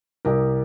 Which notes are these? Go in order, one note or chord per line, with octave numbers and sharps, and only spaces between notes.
C2 G4 A#4